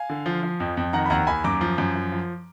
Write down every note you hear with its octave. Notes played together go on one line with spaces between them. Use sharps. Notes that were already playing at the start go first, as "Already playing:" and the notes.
Already playing: F5 G#5
D3
F3
F3
F2
F2
D#3 F#5 A#5
B5
D#2 F#5 A#5
D#2 G#5 B5
F#2 A#5 D6
F3
F#2
F3
F3